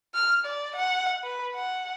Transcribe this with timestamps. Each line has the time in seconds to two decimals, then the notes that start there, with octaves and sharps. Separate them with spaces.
0.14 F6
0.45 D5
0.76 F#5
1.24 B4
1.55 F#5